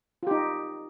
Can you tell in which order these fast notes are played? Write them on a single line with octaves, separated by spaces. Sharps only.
F4 G4 D#4